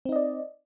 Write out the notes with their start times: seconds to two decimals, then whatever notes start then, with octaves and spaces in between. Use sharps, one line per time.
0.05 C4
0.09 D#4
0.12 D#5
0.16 D5